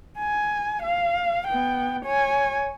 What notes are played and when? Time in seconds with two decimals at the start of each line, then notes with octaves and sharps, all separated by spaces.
0.18 G#5
0.83 F5
1.48 B3 G5
2.05 C#5 G#5